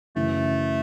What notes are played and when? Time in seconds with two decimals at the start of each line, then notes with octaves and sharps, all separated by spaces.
0.16 F#2 C#3 E3 A3